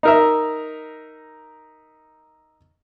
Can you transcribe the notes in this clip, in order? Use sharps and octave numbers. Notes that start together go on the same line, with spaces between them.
D#4 A#4 E5